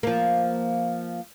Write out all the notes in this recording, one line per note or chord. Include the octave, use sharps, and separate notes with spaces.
F3 A#3